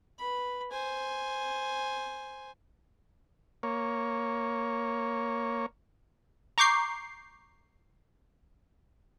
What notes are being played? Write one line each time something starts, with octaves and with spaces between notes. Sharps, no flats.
B4 B5
C5 G#5
A#3 C#5
A#5 C#6 D6 G6 C7